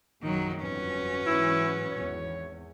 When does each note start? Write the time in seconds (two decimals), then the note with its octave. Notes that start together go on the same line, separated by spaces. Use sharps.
0.22 A#1 F#2 D#3 F#3
0.62 G1 F2 F#3 C#4 F#4 B4
1.26 G#2 E3 E4
1.91 G#1 E2 C#5